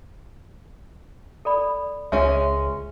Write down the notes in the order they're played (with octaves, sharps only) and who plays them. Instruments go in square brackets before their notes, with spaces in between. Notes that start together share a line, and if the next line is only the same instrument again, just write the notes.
[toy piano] A4 D5 B5
[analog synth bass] C#2 [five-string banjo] G#3 C#4 [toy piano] E5